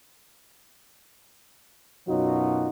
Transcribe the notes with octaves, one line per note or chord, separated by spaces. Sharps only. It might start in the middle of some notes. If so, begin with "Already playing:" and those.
F#2 B2 F#3 D#4 F4 F#4